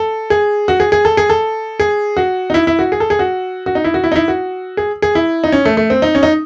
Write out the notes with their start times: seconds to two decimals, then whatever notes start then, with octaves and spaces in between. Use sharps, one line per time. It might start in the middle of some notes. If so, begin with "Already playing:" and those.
Already playing: A4
0.30 G#4
0.68 F#4
0.80 G#4
0.92 G#4
1.05 A4
1.17 G#4
1.30 A4
1.80 G#4
2.17 F#4
2.50 D#4
2.54 E4
2.67 E4
2.79 F#4
2.92 G#4
3.00 A4
3.10 G#4
3.19 F#4
3.66 F#4
3.75 D#4
3.84 E4
3.94 F#4
4.04 E4
4.12 D#4
4.16 E4
4.28 F#4
4.77 G#4
5.02 G#4
5.15 E4
5.44 D#4
5.52 C#4
5.65 A3
5.77 A3
5.90 C4
6.02 D#4
6.15 C#4
6.23 D#4